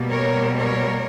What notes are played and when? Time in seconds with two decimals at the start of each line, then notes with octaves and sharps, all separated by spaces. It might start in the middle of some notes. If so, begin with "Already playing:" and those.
Already playing: B2 G3 A#3
0.11 A#4 C#5
0.56 A#4 C#5